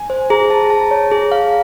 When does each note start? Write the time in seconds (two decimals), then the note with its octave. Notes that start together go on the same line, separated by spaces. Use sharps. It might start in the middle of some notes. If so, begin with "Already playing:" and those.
Already playing: G#5
0.10 C5
0.30 G#4 A#5
0.50 A5
0.70 A5
0.91 C#5
1.11 G#4
1.32 F5